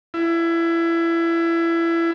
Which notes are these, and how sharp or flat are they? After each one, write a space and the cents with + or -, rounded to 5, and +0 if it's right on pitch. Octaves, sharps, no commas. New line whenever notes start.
E4 +25